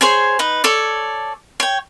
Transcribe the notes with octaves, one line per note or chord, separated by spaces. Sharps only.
G#4 C5 C#5 G#5
D#4 B4
A4 C#5 D5
C#5 G5